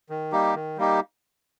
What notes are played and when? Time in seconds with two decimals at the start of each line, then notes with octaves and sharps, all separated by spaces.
0.10 D#3
0.32 G3 A#3 D#4 G4
0.55 D#3
0.77 G3 A#3 D#4 G4